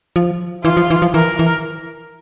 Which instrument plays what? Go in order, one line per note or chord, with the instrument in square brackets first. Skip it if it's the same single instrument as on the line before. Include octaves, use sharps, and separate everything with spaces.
[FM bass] F3
[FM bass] E3 [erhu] F4
[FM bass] F3
E3
F3
[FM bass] E3 [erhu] A#4
[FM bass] E3